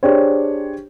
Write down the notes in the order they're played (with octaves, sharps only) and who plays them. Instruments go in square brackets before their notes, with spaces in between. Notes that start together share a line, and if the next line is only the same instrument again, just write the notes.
[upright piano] D4 G4 G#4 C5 C#5